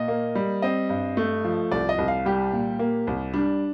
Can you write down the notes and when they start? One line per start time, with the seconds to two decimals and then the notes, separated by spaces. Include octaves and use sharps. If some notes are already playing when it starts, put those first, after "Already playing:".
Already playing: A#2 D#5
0.08 A#3
0.35 G3
0.62 C4 D#5
0.89 G2
1.17 A3
1.45 F3
1.71 C2 D5
1.89 D#5
1.98 C2
2.08 F5
2.25 G3 G4
2.52 A#2
2.79 A#3
3.07 C2
3.34 G3 D4